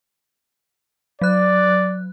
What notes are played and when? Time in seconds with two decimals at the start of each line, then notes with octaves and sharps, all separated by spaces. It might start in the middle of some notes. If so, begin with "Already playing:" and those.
1.22 F#3 D5 F#6